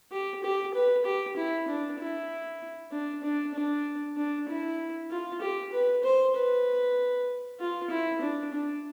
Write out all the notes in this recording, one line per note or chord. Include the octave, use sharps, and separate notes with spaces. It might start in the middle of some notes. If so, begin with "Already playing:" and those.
G4
G4
B4
G4
E4
D4
E4
D4
D4
D4
D4
E4
F4
G4
B4
C5
B4
F4
E4
D4
D4